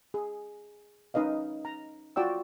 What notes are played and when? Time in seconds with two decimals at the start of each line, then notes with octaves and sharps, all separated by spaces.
0.14 G#4
1.14 C#4 D#4 B4 D#5 F5
1.65 A#5
2.16 F4 F#4 D5 G5 E6